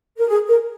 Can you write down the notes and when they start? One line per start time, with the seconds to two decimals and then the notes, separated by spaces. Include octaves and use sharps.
0.18 A#4
0.29 G#4
0.48 A#4